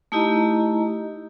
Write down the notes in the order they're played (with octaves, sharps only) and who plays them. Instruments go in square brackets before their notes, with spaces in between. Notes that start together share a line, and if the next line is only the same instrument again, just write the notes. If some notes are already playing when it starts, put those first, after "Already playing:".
[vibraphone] A3 D#4 E4 G4 D#5 A#5